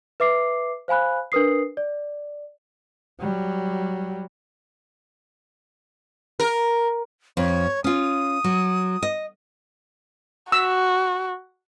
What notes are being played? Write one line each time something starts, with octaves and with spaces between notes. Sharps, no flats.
B4 E5 D6 C7
C5 F5 G#5 B5 F#6
D4 A#4 B4 D#6 C7
D5
F#3 G3
A#4
F2 C#5
C#4 F4 D#6
F#3
D#5
F#4 E6